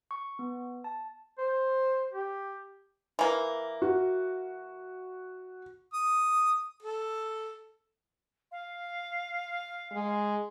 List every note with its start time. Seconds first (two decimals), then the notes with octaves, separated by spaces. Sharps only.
0.11 C#6
0.39 B3
0.84 A5
1.38 C5
2.13 G4
3.19 E3 A#3
3.82 F#4
5.93 D#6
6.82 A4
8.52 F5
9.92 G#3